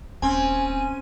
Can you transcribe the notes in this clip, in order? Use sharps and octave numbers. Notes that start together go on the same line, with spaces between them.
D#1 C4 C#4 G#5